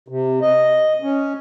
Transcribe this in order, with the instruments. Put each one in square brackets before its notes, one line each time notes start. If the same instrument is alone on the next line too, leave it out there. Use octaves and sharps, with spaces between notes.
[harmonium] C3
D#5
C#4